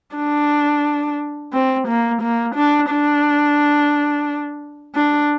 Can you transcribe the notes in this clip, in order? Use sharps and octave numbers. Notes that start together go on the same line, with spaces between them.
D4
C4
A#3
A#3
D4
D4
D4